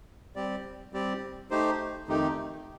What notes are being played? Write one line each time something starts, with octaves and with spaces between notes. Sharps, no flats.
G3 C4 G4 D5
G3 C4 G4 D5
A3 D#4 G4 C5
F2 D#3 A3 D#4 G4